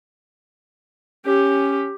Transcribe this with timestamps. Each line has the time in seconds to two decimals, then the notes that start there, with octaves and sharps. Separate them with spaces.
1.25 C#4 G4